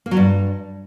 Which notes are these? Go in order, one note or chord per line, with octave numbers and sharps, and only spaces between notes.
A#3
F#3
G2